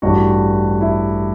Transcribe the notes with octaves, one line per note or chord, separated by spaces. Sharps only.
A1 G2 E3 F#4
E4